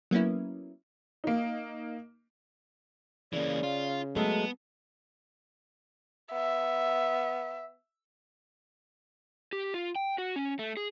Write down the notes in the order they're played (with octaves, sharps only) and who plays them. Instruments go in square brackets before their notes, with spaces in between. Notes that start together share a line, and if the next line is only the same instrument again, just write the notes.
[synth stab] F#3 A#3 B3 C#4 E4
[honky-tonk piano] A#3 D#4
[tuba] C#3 [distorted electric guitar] E3 A#3 [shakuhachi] D5
[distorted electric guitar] F4
[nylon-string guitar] F#3 G#3 A3 [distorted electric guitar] B3 [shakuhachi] A5
[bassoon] B3 [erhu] E5
[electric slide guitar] G4
F4
G5
F#4
C#4
A3
G#4